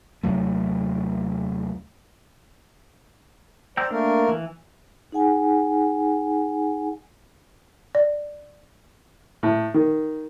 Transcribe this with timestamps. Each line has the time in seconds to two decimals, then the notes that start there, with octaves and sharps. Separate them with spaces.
0.23 D#2 C3 F#3 A3
3.77 C5 D5 G5 A#5 E6
3.91 A3 A#3 D4 A#4
4.29 E3
5.12 D#4 G#4 F#5 G#5
7.95 D5
9.43 A2
9.74 D#3